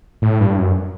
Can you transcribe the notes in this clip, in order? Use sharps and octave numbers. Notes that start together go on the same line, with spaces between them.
A2
G2
F#2